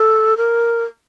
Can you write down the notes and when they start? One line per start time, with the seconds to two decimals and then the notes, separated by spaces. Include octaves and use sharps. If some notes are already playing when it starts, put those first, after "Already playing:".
Already playing: A4
0.37 A#4